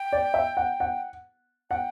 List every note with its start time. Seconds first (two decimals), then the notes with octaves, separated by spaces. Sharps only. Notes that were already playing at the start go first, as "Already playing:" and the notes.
Already playing: G5
0.13 D5
0.34 E5
0.57 F#5
0.80 F#5
1.70 F#5 G5